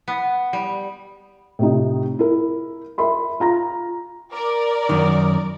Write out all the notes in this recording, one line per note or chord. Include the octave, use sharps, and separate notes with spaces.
B3
G3
A2 C3 D#4
E4 A#4
A#4 E5 B5 C6
F4 A#5 A#6
A#4 D5
F#2 D#3